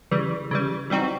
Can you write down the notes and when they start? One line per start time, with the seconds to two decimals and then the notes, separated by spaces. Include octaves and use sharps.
0.11 C#3 E3 G3
0.51 C#3 E3 G3
0.90 E3 G3 C4 D#4 F#4